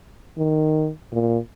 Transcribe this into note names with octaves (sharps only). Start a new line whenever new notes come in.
D#3
A#2